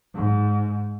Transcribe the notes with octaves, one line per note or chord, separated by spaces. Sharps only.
G#2